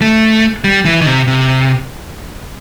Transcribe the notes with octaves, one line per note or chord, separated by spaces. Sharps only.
A3
G3
E3
D#3
C3
C3